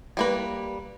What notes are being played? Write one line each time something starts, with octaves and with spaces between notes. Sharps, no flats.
G3 A#3 B4